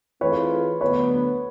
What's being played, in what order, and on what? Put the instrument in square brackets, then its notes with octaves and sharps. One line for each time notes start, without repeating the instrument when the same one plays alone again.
[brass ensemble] E3 A3 C4 F4 G#4 [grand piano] B4 C#5
[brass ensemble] D2 D3 F#3 B3 [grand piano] B4 C#5